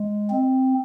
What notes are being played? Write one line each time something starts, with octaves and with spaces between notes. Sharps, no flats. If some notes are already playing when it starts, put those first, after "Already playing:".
Already playing: G#3
C4